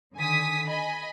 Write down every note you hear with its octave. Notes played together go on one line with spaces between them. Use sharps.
D3 D#3 G#5 D#6 B6
D#5 G#5 B5